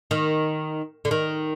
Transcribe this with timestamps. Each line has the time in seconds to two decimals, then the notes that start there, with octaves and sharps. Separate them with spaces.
0.11 D#3
1.05 D3
1.11 D#3